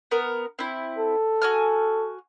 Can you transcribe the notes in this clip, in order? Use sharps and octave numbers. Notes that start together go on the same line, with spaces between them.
B3 A#4
C4 E4
A4
F#4 G#5 F6